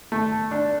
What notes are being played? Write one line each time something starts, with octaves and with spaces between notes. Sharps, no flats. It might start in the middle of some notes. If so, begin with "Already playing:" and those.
A3
D4